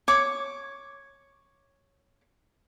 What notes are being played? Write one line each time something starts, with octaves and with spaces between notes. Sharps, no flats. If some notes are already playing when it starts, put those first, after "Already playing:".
C#5 D6